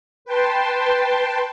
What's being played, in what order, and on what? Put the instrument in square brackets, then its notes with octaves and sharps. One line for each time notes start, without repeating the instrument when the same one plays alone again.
[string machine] B4 G5 A5 C6